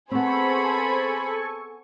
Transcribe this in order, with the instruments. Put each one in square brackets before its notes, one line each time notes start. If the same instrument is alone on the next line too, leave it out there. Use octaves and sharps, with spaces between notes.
[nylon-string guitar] B3 C4 [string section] G#4 C5 B5 [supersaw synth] A4 G#5 C#6